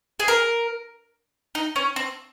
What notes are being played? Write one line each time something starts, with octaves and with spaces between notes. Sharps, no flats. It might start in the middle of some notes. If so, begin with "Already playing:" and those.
G#4
A#4
D#4
C#4
C4